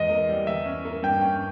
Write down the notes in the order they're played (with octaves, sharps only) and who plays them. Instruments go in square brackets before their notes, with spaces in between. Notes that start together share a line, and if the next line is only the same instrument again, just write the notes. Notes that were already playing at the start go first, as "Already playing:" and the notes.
Already playing: [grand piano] E2 G#3 [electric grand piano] D#5
[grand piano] A#3
G3
[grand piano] E2 [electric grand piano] E5
[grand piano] C#4
A#3
[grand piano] G2 [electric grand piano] G5
[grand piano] C#4